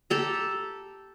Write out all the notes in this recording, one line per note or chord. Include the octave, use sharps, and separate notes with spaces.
G4 A4 A#5